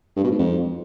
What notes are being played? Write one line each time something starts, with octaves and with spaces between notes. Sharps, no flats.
G2
B2
G#2
F2